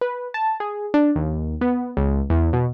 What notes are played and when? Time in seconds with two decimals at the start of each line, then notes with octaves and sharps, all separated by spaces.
0.01 B4
0.34 A5
0.60 G#4
0.94 D4
1.16 D#2
1.61 B3
1.97 C#2
2.30 E2
2.53 B2